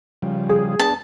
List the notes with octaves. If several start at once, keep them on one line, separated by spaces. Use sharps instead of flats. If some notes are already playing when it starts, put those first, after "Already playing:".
C#3 F3 G3
G#4
B3 D4 A5